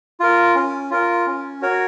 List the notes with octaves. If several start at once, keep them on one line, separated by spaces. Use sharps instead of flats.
F4 A#4
C#4
F4 A#4
C#4
F#4 A#4 C#5